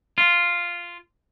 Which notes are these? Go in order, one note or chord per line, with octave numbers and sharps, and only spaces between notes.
F4